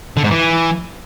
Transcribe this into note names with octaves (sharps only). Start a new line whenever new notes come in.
D3
G#2
E3